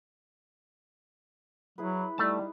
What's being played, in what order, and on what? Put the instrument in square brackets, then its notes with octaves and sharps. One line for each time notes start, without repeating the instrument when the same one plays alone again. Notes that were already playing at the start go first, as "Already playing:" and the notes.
[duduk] F#3 [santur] E4 G#4 B4
[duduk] G3 [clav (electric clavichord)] A3 A5 [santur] D#4